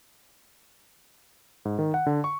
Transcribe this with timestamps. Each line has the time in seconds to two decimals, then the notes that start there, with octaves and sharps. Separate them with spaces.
1.65 G#2
1.79 D#3
1.94 F#5
2.06 D3
2.24 C#6